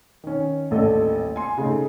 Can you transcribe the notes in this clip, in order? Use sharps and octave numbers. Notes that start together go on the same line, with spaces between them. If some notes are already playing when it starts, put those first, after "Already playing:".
D#3 C#4
D#1 A1 A3 D4 A4 D#5
G#5 C6
C#3 A3 D#4